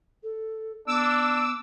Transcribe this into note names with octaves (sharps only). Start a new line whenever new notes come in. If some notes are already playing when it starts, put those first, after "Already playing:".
A4
B3 D4 D6 E6